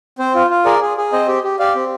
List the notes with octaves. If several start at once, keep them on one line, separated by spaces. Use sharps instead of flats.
C4 C5
F4
F4
G#4 A#4 D5
G#4
G#4
C4 C5 D#5
G4
G4
G4 D5 F5
C4